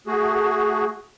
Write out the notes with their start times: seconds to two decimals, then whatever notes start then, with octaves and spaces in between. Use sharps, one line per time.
0.07 A3 F#4 G#4